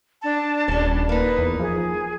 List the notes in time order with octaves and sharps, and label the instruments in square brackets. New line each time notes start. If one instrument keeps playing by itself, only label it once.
[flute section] D4 A5
[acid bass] D#1 [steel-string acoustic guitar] G3 C#4
[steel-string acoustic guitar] A#3 D#4 [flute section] B4
[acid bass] E2
[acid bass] F3 [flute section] G#4